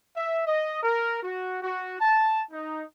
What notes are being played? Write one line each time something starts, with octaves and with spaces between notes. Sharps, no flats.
E5
D#5
A#4
F#4
F#4
A5
D#4